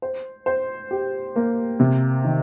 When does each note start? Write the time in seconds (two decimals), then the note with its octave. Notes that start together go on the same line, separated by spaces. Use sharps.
0.02 C5
0.46 C5
0.91 G4
1.36 A#3
1.80 C3
2.24 D#3